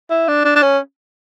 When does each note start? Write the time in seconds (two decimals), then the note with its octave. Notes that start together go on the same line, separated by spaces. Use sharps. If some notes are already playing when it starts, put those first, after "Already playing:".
0.10 E4
0.28 D4
0.45 D4
0.56 D4
0.63 C#4